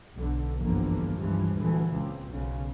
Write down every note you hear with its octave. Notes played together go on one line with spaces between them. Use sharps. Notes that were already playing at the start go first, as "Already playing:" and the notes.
B1 D3
F#1 E2 G2 D3 F3 A#3
C#2 G2 E3 F3 G3 G#3
D2 A#2 E3 G#3
C#2 C4
B1 C#3